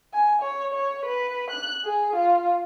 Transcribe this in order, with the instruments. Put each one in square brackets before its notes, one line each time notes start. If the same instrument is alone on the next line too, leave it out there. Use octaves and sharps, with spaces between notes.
[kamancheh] G#5
C#5
C#5
B4
F#6
G#4
F4